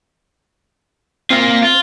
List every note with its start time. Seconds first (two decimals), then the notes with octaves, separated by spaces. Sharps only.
1.30 A#3 C4 F4
1.63 F4